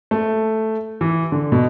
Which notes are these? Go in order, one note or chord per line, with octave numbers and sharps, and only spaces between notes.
A3
E3
D3
B2